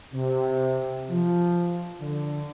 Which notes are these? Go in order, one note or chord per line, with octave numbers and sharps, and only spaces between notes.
C3
F3
D3